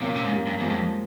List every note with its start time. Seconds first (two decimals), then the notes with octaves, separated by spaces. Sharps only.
0.01 C3 A#3 C#4
0.09 A#2
0.16 C3
0.24 G#2
0.32 G3 A#3
0.47 G2
0.60 E2 F3 G#3
0.70 F2